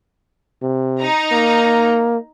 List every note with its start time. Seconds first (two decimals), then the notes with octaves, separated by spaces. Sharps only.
0.62 C3
1.00 D#4 A#5
1.32 A#3